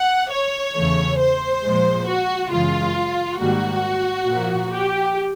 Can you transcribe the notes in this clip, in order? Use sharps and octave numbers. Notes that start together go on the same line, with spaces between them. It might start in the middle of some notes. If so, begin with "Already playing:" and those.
Already playing: F#5
C#5
E2 C#3 E3 A3
C5
A#2 F3 G#3
F#4
F#2 C#3 E3 G#3 F4
G#2 D#3 G3 A#3 F#4
A#2 F3 A#3
G4